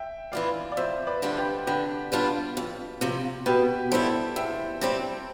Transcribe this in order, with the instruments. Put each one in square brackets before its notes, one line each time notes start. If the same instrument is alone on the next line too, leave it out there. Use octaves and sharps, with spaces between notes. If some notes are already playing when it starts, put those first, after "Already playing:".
Already playing: [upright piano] E5 G5
[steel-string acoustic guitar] E3 B3 F4 [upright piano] D5 F5
[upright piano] D5
[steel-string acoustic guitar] F2 [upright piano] C5 E5
[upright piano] B4 D5
[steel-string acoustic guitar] D3 G3 D4 F4
[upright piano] G4 B4
[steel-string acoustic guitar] D3 [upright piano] G4 B4
[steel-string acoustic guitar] G3 B3 D4 F4
F2
C3 F3
[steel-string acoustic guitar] B2 [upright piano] G4 B4
[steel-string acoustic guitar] G3 B3 E4 [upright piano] A4 C5
[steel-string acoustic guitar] E2 [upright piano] E5 G5
[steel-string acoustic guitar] C3 G3 C4